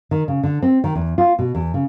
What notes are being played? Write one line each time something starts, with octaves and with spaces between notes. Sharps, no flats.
D#3
C#3
D3
C4
D#3
E2
F4
B2
E2
C#3